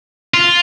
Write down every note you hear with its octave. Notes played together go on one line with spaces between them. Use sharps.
F4